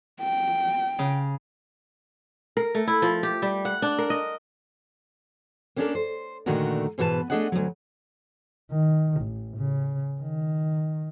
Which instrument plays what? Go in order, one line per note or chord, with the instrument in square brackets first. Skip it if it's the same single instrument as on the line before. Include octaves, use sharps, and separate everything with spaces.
[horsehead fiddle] G5
[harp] C#3
[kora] A#4
A3
E4
F3
G4
G3
F#5
D4
A#4
D#5
[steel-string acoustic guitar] A#3 B3 C#4 D4 A4 A#4
C5
A#2 D3 D#3 A3 F#4 A#4
G#2 B2 E3 F#4 B4 A5
A3 C4 D4 G#4 D#5 F#5
D2 F#3
[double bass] D#3
A1
C#3
D#3